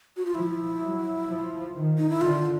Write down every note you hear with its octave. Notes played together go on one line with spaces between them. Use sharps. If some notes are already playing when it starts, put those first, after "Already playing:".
F#4
F4
F3 E4
F#3
F3
D#3
D#4
E4
D3 F4